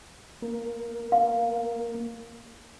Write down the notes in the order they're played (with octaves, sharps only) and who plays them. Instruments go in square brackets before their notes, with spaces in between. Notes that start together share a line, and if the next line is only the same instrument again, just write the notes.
[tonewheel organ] A#3
[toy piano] F5